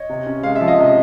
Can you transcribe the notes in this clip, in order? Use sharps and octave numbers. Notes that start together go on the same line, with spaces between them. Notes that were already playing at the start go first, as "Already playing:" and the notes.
Already playing: C#5 D#5
C3
C#4
G#3 F5
E5
F3
D#5 F5
C3